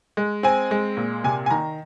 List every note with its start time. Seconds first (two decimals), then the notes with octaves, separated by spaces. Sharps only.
0.17 G#3
0.43 C4 G#5
0.71 G#3
0.97 A#2
1.24 C3 G#5
1.46 G#5
1.51 D#3 A#5